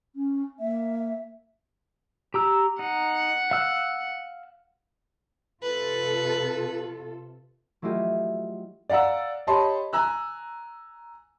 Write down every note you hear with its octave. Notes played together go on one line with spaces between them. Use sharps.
C#4
A#3 E5
G4 A#5 E6
D#4 F#5
F5 E6 F#6
C3 F4 A4 B4
F#3 A3 E4 F4 G4 D#5
D5 F5 F#5 A#5 E6
G4 C#5 D#5 A5 B5 C6
G#5 A#5 E6 F#6